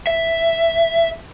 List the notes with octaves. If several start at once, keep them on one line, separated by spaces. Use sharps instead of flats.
E5